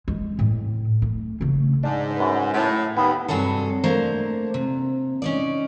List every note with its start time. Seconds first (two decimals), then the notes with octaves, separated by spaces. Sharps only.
0.08 G#3
0.39 A2
1.02 A3
1.41 C#3 A3
1.83 G#2 D4
2.17 F#2 B4
2.53 A2
2.97 D#2 B3
3.28 G2 C3 F#3 G#4 A4
3.84 A3 A#3 D4 C5 A#5
4.54 C3
5.22 C#4 D#4 D5